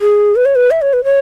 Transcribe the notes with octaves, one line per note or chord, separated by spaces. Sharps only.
G#4
B4
C#5
B4
E5
C#5
B4
C#5